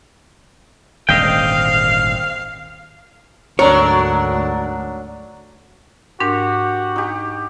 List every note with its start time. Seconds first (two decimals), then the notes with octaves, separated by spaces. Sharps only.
1.09 D#1 G#1 D3 C4 D#5 F5 G5
3.59 D2 G#2 F#3 D4 A#4 C#5
6.20 G#2 D4 F#4 G4 A#4
6.96 D#4 G4